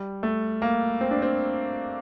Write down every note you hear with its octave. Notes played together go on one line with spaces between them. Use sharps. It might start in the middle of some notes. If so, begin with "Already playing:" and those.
Already playing: G3
A3
A#3
C4
D4
C4